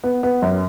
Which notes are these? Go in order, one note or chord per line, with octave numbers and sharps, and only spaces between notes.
B3
B3
F#2